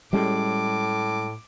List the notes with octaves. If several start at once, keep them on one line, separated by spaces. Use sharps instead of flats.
A2 G3 G#3 C#4 D6